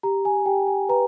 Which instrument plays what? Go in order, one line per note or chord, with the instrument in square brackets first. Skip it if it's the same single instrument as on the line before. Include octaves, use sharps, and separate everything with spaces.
[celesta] G4 A#5
G#5
G4 G5
G#5
B4 A#5